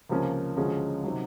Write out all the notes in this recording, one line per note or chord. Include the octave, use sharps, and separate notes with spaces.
C#2 C3 F3 A#3 C#4
D2 C#3 F3 G#3 C#4
C3 D#3 F#3